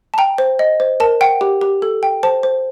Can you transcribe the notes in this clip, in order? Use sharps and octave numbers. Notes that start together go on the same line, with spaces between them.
A5
G5 A#5
C5
D#5
C5
A#4 A5
F#5 G5
G4
G4
A4
G5
C5 A5
C5